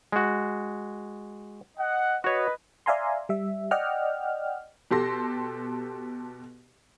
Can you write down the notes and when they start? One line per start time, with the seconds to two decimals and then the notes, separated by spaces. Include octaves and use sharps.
0.12 G#3 F#4
1.78 D#5 F#5
2.24 F#4 B4 C#5 D#5
2.86 D5 E5 F5 G#5 A#5 C6
3.29 G3 E5
3.71 D5 D#5 F#5 G5 F6
4.91 B2 G4 A4 C6 A#6